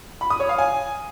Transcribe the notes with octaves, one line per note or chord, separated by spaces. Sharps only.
B5
D#6
C#5
F5
G#5